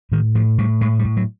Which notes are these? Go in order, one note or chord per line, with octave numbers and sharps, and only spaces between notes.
A2 D#3
A2 F3
A2 G3
A2 G#3
G3
A2
F#3